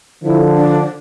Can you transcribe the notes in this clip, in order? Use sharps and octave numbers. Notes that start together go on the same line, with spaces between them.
D3 F3 E4
D4